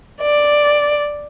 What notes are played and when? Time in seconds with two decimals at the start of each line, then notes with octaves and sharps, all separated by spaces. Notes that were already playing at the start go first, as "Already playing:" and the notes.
0.22 D5